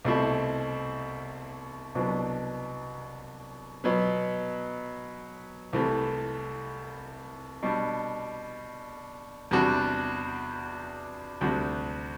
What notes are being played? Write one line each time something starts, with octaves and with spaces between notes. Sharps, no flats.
C2 B2 A3 C4 E4
C2 B2 F#3 B3 D4
B2 F#3 B3
C2 C3 E3 A3
B2 G3 D4
E2 C3 G3 D4 F#4
D2 C3 G3 D4 F#4